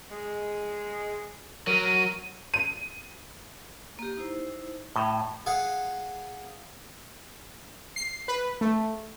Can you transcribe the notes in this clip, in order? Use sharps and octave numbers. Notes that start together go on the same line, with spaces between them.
G#3
F#3 A#4 D#7
D#7
A#3 G4
D#4 E4 C5
A2 G5
G#4 F5 F#5
C7
B4
A3